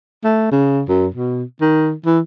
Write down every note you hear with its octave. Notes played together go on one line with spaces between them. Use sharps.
A3
C#3
F#2
B2
D#3
E3